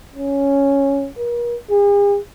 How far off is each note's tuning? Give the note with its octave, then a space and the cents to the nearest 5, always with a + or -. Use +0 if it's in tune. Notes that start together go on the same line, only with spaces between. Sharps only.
C#4 +0
A#4 +40
G#4 -45